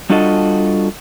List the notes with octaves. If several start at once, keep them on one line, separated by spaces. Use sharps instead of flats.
G3 D4 F4 F#4 A4 D#5